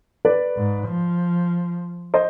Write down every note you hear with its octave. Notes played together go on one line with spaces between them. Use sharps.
B4 D5
G#2
F3
C5 D#5